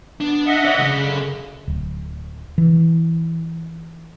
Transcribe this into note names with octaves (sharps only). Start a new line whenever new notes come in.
B3 D4
D#5 E5 F#5
C#5 D5
C#2 C#3
F#2 D3
D1
E3